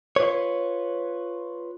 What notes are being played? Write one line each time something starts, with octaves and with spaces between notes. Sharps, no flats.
F4 B4 C#5